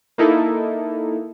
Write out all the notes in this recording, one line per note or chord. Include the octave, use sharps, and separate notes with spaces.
A#3 D#4 E4 A4